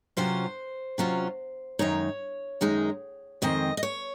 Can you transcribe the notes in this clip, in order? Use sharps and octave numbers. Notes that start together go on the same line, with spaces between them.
C3 F#3 C#4 F4 C5
C3 F#3 C#4 F4
F#2 D#3 G#3 D#4 C#5
F#2 D#3 G#3 D#4
F2 D#3 G#3 C4 D#5
D#5
C#5